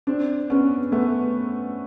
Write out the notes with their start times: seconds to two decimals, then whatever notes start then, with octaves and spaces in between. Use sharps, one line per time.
0.07 C4 D4
0.50 B3 C#4
0.92 A3 B3